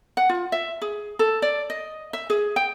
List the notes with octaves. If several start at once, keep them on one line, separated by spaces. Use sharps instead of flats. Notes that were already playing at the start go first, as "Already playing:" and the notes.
F#5
F4
E5
G#4
A4
D5
D#5
E5
G#4
G5